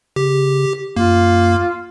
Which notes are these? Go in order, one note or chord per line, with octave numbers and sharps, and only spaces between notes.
C#3 G4
F#2 A#3 F4